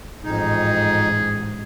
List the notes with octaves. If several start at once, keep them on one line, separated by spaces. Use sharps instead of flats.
A1 F2 G#2 D#4 G#4